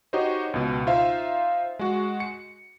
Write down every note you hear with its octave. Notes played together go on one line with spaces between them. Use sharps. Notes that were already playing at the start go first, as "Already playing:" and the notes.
D#4 F#4 G4 C5 C#5 D#5
C#2 B2
D#4 F4 C5 E5 F5
G#3 F#4
C#7